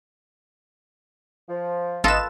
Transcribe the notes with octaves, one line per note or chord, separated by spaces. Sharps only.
F3
G#1 F4 A4 B4 D#5 E7